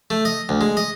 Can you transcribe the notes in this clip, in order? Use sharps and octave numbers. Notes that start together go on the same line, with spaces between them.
A3
D#5
D2
G#3
D#5